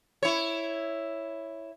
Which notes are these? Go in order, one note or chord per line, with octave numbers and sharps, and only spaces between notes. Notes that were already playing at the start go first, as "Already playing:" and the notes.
E4 C#5